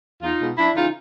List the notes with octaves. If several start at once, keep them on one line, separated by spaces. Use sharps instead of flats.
E2 D#4 F4
B2 G#3
F#2 D4 E4
C#3 E3 D#4 F4